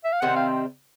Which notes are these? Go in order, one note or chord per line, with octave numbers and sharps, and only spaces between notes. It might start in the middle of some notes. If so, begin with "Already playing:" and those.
E5
F5
C3 D#3 G3 C4 F#5
F5